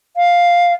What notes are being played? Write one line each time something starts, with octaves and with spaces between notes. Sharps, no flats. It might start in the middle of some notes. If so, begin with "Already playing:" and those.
F5